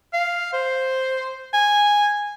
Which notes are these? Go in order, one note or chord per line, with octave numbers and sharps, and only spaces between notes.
F5
C5
G#5